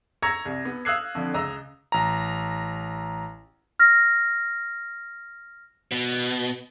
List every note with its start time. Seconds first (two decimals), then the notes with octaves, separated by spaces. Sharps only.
0.22 A#5 C#6 E6 G#6 A#6 C#7
0.46 C2
0.65 B3
0.85 F5 D#6 E6 F#6 G#6 C7
1.15 F2 D3
1.34 C#2 D#5 A#5 E6
1.92 A1 A#5
3.79 F6 A#6
5.91 B2